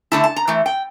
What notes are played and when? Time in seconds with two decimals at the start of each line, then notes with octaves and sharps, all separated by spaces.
0.12 D3 A3 E4 A5
0.24 A5
0.36 A#5
0.48 E3 A3
0.66 G5